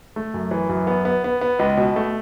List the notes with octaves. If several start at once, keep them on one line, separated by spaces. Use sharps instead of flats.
A3
F#2
E3
F#2
B3
B3
B3
B3
C#2
B2
A3